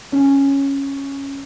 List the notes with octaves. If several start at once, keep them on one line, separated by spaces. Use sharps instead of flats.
C#4